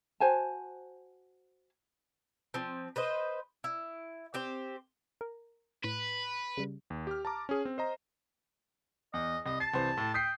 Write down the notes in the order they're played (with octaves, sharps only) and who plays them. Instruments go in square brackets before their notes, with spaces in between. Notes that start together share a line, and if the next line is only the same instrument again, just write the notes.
[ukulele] F#4 C5 G#5 A5
[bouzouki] F3 C4
B4 C5 D#5
E4
C4 G4 C5
[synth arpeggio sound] A#4
[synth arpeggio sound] A2 [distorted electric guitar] B4
[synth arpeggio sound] C#3 G3
[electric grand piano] D#2
G4 F6
A5 A#5 D6
C#4 G#4
C4
C5 D#5 A#5
[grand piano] E2 [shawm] D#5
[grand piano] C2 [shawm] D#5
[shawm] A5 [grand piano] C7
[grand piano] C2 E3 C5
A2
[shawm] G5 [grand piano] D#6 B6 C7